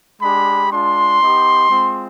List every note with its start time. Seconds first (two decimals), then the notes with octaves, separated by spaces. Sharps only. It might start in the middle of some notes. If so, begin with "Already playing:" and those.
0.21 G#3 D4 G4 B5
0.71 G#3 D4 F4 C6
1.20 B3 D#4 G4
1.69 G#3 C4 F4